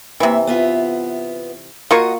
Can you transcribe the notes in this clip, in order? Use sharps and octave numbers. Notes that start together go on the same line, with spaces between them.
C3 E3 A#3 E5
B3 F4 E5
A#3 F4 F#4 D#5 C#6